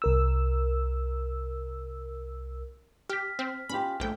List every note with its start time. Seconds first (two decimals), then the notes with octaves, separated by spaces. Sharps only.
0.02 C2 A#4 E6
3.10 G4 F6 B6
3.39 C4
3.69 C#4 F4 G4 B5
4.00 A#1 F3 A3 G5